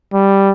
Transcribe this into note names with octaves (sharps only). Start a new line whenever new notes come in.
G3